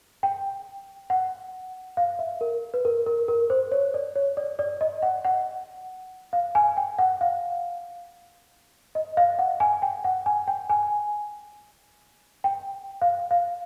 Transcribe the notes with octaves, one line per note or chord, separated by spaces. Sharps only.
G5
F#5
F5
E5
A#4
B4
A#4
A#4
A#4
C5
C#5
D5
C#5
D5
D5
D#5
F#5
F#5
F5
G#5
G5
F#5
F5
D#5
F5
F#5
G#5
G5
F#5
G#5
G5
G#5
G5
F5
F5